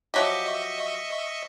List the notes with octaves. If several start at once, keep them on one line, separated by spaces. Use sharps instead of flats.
F3 F#3 G4 D#5 E5 C#6